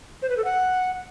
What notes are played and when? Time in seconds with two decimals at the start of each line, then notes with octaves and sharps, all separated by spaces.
0.22 C5
0.30 B4
0.37 A4
0.45 F#5